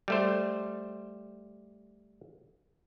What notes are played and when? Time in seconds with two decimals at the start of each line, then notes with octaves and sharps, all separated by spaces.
0.08 G3 A3 C5